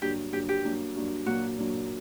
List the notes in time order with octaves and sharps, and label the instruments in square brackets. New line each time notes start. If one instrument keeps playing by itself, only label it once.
[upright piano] G2 D3 F#3 A#3 [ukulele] G4
[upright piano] G2 D3 F#3 A#3 [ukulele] G4
[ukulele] G4
[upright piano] G2 F#3 A#3 D4
G2 F#3 A#3 D4
[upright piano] A#2 F#3 A#3 D4 [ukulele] F#4
[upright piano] A#2 F#3 A#3 D4